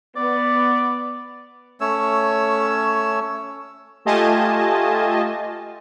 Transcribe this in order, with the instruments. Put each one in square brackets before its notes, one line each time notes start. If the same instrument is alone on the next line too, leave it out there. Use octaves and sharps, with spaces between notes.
[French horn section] B3 [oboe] D5
[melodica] A3 C#4 C#5 E6
[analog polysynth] A3 F4 G4 D#5 G#5 A5